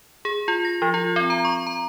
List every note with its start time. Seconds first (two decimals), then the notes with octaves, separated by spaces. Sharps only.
0.25 G#4
0.48 F4
0.65 A#6
0.82 F3
0.94 F4
1.16 C4
1.30 A#5
1.45 C#6
1.67 A#5